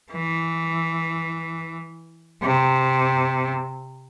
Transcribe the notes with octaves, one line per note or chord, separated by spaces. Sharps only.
E3
C3